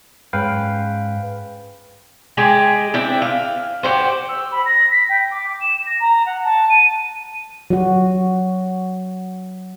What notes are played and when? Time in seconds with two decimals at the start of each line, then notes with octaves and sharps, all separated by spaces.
0.33 G#2 C#4 B4 F5 G5
2.37 G#3 G4 G#4
2.94 C4 D4 E4
3.22 F5
3.83 F#4 G4 C5
4.28 E6
4.51 B5
4.65 A#6
4.91 B6
5.09 G5
5.31 D6
5.60 E7
5.86 A#6
6.00 A#5
6.26 F#5
6.44 A5
6.69 D#7
7.70 F#3 F#4